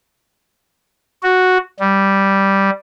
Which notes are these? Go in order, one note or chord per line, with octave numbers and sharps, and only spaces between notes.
F#4
G3